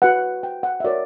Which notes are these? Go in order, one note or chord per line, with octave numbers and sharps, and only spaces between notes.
F#4 B4 F#5
G5
F#5
E5
F#4 A#4 C#5 D5